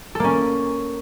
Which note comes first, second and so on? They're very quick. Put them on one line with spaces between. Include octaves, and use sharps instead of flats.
A4 A#3 C#4